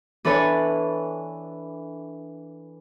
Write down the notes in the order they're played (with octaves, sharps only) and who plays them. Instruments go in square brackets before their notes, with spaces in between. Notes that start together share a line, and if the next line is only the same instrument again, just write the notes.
[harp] E3 D4 A4 B4 C#5